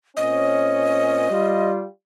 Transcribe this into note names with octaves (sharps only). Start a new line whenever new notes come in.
A#2 C4 C#4 D#5
G3 F4